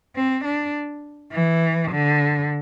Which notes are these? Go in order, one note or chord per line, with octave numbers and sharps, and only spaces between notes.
C4
D4
E3
D3